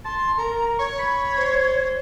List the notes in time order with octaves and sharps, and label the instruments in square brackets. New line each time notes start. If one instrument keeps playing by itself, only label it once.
[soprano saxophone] A5 [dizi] C6
[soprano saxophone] A#4 [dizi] A#5
[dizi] C#5 [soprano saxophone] C#6
[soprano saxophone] B5
C5